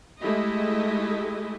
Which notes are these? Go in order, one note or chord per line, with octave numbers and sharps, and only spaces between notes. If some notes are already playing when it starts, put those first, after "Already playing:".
G#3 A3 E4 G4 D#5